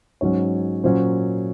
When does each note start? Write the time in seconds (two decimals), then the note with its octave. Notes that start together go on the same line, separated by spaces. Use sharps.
0.21 G#2 F#3 C#4 C#5
0.84 A#2 F#3 A#3 C#4 C5